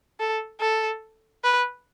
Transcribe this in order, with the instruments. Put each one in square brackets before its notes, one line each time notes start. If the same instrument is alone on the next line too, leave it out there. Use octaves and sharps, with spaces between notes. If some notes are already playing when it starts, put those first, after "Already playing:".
[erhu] A4
A4
B4